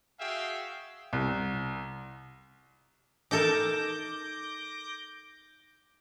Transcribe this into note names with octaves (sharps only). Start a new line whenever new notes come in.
F#4 G#4 E5 F5 G5
C2
D#4 A4 A#4 D6 G6 A#6